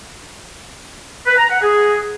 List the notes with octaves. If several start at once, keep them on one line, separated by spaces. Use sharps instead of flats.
B4
A#5
F#5
G#4